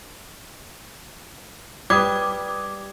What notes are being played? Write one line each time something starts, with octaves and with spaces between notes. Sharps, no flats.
G3 B4 D6 D#6 G#6